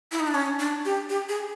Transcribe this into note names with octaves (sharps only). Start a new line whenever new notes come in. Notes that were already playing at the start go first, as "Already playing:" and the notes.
E4
D#4
D4
C#4
D4
G4
G4
G#4